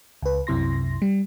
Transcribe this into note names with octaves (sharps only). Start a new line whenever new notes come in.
C#2 B4
C2 F#2 C3 E4 C6 A#6
G3